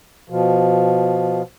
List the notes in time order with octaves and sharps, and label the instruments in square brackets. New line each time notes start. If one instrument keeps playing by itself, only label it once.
[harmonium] B2 F3